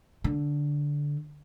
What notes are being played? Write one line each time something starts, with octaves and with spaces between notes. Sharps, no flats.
D3